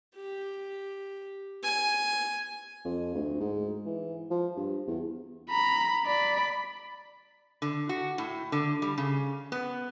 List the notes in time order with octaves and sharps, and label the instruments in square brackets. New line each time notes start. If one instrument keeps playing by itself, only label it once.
[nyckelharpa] G4
G#5
[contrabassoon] F2
D2
G#2
E3
F3
G2
E2
[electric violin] A#5 B5
D5 B5
[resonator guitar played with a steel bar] D3
F#4
A2
D3
G3
C#3
B3